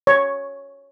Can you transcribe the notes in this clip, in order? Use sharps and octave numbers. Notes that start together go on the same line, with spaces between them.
C#5